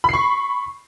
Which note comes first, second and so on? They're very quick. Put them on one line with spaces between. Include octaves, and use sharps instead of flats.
B5 C7 C#6